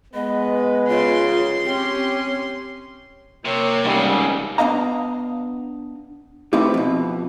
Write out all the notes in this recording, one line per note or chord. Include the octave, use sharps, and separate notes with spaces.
G#3 B3 B4 D#5
C#3 F4 C6
C4 C#4 G4
C3 A#3 C#5
G#2 C#3 G3
B3 D4 D#5 F5 A#5
A3 B3 C4 D#4 E4 G4
F2 B2